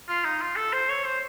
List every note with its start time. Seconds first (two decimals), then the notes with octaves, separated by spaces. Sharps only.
0.08 F4
0.25 D#4
0.41 F4
0.56 A4
0.73 C5
0.89 C#5
1.04 C5